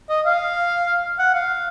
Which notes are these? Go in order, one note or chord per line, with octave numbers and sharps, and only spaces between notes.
D#5
F5
F#5
F5